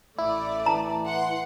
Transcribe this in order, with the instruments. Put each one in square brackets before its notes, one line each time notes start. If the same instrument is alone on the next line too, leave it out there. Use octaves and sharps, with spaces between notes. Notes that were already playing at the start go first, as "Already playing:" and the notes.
[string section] A1 A3 D5 [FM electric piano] E4
[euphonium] E3 [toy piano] A5 A#5
[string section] F#5 C6